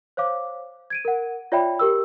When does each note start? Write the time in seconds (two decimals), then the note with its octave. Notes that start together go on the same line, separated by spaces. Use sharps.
0.17 C5 C#5 F5 D6
0.90 G#6 D7 D#7
1.05 A#4 F#5
1.52 F4 C#5 D5 E5 G5 B5
1.79 G4 A#4 E6